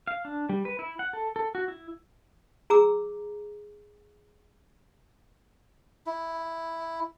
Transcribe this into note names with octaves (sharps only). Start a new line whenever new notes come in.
F5
D4
G3
B4
E4
F#5
A4
A4
F#4
E4
G#4 A#5 D6 E6
E4